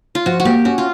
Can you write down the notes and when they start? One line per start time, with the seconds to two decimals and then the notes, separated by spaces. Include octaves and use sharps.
0.15 F4
0.26 F3 F#4
0.40 F#4
0.45 A#3 G4
0.65 C#4 F#4
0.78 F4